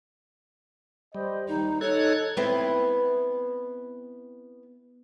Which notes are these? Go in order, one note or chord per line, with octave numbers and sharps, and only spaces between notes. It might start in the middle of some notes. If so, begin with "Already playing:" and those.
G3 C5 D#5
D#2 D#4
D#4 A4 C#5 F#6 G#6
B3 C4 E4